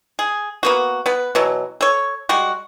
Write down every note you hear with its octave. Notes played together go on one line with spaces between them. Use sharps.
G#4
A#3 B3 F#4
B3 B4
B2 E3 F#3
A4 C#5
G3 G#3 F#4